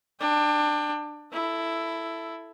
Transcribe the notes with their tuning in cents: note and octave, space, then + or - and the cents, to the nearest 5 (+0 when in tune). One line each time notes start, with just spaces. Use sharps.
D4 +20 G5 +30
E4 +10 A4 +0